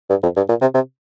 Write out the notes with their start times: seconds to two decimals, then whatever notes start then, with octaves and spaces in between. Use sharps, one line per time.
0.10 G2
0.23 F2
0.37 G2
0.49 A#2
0.62 C3
0.75 C3